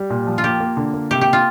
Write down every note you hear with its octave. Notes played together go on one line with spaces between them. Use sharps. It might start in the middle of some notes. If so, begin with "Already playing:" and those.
Already playing: G3
A#2
F3
F4
A#3 G4
A#3
D3
A#3
C3 G4
G4
A#3
F4